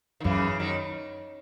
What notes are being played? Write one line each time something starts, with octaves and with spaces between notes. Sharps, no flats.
D#3
F#2 C#3 E3
D#3 F#3